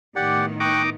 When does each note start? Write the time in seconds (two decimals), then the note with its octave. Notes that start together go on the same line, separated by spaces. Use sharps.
0.16 A2 D#3 B3 G4 D5 F#5
0.60 D#4 G5 C#6 D6 F#6